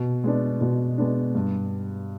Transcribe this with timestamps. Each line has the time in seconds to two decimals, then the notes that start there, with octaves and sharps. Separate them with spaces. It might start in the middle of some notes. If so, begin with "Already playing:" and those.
Already playing: B2
0.24 G#3 B3 D4
0.61 B2
0.98 G#3 B3 D4
1.35 G2